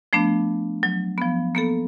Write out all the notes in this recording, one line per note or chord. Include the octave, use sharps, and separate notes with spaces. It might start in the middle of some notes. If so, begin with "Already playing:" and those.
F3 A3 B3 D4
F#3
F3 B3
A#3 B3 A4